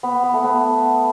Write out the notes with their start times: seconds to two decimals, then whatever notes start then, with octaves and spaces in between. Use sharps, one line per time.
0.03 B3
0.23 B3
0.34 A3
0.44 B3